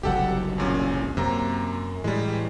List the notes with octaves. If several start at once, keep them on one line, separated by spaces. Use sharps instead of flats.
F#1 C2 F#3 G4 A4 F#5
E2 A#2 C#4
F#2 C3 A#3 A#5
A2 E3 G3 G#3